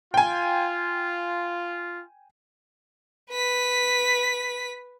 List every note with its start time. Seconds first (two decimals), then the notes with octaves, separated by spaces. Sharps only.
0.14 F4 G5 G#5
3.32 B4 B6